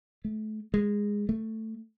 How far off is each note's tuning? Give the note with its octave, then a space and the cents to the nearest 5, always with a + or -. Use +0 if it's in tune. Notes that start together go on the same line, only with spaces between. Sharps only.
A3 -30
G#3 -15
A3 +10